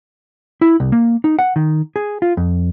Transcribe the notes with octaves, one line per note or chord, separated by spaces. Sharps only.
E4
C2
A#3
D#4
F#5
D#3
G#4
F4
F2